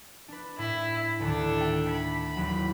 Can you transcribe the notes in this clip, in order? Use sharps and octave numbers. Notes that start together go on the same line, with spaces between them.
D4 B4
A2 E4
D2 A2 D#3 D4 A4
E5 G5
B5 G#6
A1 D#2 F#3